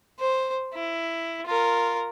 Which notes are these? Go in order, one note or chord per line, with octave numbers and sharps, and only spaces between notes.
C5
E4
F4 A#4